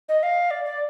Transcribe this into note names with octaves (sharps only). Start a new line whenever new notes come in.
D#5
F5
D5
D5